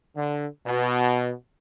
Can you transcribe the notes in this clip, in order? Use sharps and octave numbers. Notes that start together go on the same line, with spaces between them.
D3
B2